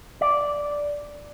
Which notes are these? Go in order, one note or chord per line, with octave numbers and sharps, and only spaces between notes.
D5